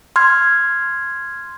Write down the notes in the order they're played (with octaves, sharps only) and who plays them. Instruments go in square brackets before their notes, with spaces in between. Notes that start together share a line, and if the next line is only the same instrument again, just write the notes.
[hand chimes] C6 F6 G#6